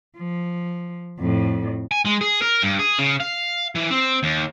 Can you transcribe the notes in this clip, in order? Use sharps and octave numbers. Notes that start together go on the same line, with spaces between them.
F3
F2 A2
G#5
G#3
G#4
A#4
G2
G#4
C#3
F5
E3
C4
D#2